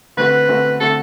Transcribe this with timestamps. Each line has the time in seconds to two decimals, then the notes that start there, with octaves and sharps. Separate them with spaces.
0.17 D3 A3 C4 F#4 B4
0.48 D3 A3 C4 F#4
0.80 D3 A3 C4 F#4 A4